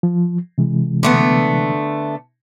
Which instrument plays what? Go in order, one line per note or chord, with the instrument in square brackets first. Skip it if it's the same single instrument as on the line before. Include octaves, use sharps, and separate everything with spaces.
[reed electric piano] F3
C3 E3 G#3
[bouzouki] D3 A3 B3